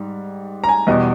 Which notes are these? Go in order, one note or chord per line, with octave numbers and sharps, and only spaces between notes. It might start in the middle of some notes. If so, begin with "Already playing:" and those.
Already playing: G#2 G3
A#5
G#5
E2 B2 G3 D#5